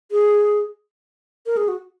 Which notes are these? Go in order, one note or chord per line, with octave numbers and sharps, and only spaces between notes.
G#4
A#4
G#4
F#4